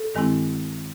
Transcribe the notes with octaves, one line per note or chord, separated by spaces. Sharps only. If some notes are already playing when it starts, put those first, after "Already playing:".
Already playing: A4
G2 D#3 G#3 C4 E4